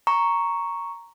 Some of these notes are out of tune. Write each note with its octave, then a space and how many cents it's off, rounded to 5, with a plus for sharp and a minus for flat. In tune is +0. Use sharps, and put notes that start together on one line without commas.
A#5 +0 C#6 +0